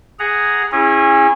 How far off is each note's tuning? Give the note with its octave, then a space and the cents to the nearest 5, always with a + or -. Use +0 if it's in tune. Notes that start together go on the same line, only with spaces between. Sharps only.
G#4 +0 F#5 +0 A#5 +0
C#4 -30 E4 +0 G#4 -30